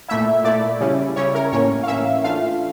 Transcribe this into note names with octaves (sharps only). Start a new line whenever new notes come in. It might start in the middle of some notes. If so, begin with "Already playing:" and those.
A#2 A3 E4 E5
A#2 A3 E4 D5
C#3 G3 C#4 E4
C#3 G3 C#4 E4 C#5
A#4
A2 E3 A#3 C#4 C#5
F5
A2 E3 A#3 C#4 E5
E3 A3 D4 F4 F5